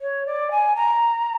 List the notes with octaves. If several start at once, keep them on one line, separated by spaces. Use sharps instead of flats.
C#5
D5
G#5
A#5